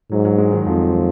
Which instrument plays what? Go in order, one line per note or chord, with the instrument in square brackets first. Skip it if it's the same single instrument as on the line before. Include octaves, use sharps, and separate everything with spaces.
[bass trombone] G#2 [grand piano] F#3
[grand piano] F#3
G#3
D#3
[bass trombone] F2 [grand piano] F3
[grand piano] D#3